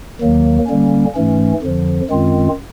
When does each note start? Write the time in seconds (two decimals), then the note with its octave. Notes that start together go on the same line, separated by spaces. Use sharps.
0.21 D#2 D#3 F#3 A#3
0.67 D3 G3 A#3 C#4
1.15 G#2 E3 A3 C#4
1.62 F2 D3 F3
2.10 F#2 D#3 G#3 C4 F4